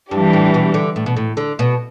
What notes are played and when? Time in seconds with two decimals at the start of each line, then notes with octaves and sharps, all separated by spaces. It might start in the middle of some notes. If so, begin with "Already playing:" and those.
0.11 G2 E3 G3 D4 G4
0.33 A2
0.54 B2
0.74 D3
0.96 A2
1.06 B2
1.16 A2
1.37 D3
1.59 B2